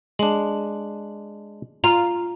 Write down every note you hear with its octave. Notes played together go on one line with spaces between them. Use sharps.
G#3 D4 F#7
F4 A#5